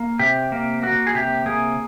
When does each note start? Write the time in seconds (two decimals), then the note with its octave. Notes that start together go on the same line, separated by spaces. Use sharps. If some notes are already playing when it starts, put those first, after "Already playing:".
Already playing: A#3
0.19 C3 G4
0.52 A#3
0.82 A#3 F#4
1.07 G#4
1.15 C3 G4
1.46 A#3 G#4